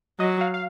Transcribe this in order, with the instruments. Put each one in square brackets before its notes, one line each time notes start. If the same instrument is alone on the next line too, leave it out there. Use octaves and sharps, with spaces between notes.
[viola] F#3 [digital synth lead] D#5
[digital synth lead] F5
F5